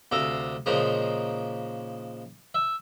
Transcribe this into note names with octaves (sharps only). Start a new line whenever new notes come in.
D2 C3 A4 F5 A#5
A#2 C#3 F3 G#3 D#4
E5